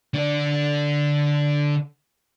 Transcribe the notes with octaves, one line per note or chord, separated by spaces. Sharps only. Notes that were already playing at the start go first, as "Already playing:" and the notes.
D3 D5